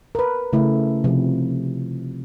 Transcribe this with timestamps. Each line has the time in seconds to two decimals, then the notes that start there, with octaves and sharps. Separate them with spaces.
0.15 A#4 B4
0.53 C#3 A3 E4
1.04 C3 F3